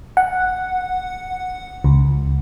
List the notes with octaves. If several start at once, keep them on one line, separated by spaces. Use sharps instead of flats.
F#5
C#2